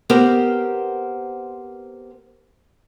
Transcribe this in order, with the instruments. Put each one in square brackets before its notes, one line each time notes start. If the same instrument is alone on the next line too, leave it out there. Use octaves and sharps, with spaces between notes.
[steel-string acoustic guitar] B3 C4 G4 A#4 C5